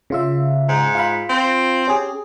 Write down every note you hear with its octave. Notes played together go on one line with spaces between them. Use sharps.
C#3 F4 E5
G#2
F4 F5 B5
C4
C#4 G4 G#4